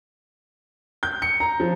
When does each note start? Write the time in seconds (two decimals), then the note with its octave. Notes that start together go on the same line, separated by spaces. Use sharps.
1.03 G6
1.22 C#7
1.40 A#5
1.60 F3